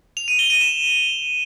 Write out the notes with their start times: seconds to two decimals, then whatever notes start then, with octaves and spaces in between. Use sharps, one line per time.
0.17 F7
0.28 D#7
0.39 G7
0.50 D#7
0.61 E7